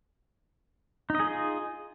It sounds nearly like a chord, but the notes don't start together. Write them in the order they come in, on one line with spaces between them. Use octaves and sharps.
D#4 D#5 G#4 F4